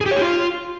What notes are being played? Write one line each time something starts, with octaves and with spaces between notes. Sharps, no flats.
G#4
G4
C#5
G4
F4